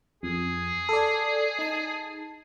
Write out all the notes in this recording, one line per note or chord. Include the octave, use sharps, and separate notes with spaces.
F2 G#4
A4 D5
D#4 A5